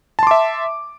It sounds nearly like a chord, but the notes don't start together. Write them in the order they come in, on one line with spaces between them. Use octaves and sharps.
A5 C6 D6 E5